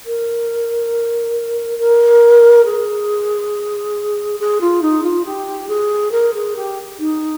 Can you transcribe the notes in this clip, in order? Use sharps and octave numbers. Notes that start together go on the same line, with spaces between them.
A#4
A#4
G#4
G#4
F4
D#4
F4
G4
G#4
A#4
G#4
G4
D#4